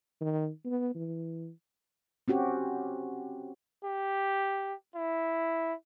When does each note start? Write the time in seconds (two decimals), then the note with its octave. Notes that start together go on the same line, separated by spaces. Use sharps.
0.21 D#3
0.65 B3
0.95 E3
2.28 C4 C#4 F#4 G4
3.85 G4
4.95 E4